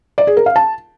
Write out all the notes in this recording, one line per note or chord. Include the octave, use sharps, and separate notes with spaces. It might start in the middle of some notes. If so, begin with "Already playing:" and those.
D5
G#4
A#4
F5
A5